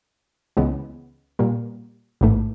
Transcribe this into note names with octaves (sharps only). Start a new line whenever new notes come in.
C#2 C#3 E3 G#3 B3
A#2 G3 A#3
A1 G#2 E3 A3